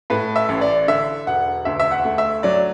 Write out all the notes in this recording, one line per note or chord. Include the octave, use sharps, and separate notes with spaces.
A2 B4
E5
A1
D5
D3 E5
E1 F#5
D2 E5
E5
F#5
A3
E5
F#3 D5